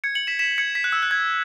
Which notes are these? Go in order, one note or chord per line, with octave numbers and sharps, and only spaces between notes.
G#6 C#7
C#7 F#7
B6 E7
B6 E7
G#6 C#7
B6
F#6
E6
F#6
G#6